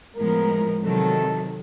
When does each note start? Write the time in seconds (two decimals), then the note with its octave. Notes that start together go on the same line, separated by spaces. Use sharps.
0.16 A2 F3 G#3 B3 A#4
0.83 C3 D#3 F#3 A4